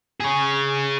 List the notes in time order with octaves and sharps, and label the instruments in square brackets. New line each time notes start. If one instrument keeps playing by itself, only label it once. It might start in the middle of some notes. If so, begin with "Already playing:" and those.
[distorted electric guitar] G#4 C#5